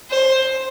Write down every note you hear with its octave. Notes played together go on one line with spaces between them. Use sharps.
C5